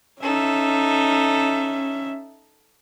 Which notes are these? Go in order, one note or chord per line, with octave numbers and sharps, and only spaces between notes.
C#4 D#4 A4 E5